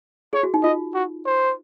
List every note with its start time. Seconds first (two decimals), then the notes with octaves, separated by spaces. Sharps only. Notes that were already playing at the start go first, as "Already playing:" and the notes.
0.33 G#4 C#5
0.43 F#4
0.54 D#4
0.63 F4 D#5
0.94 F#4
1.26 C5